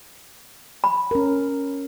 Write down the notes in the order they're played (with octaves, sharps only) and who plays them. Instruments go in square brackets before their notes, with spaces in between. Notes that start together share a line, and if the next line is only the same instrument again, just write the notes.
[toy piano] B5
[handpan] C#4 A#4